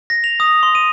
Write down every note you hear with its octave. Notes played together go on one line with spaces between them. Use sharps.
A#6
F7
D#6
C6
D#7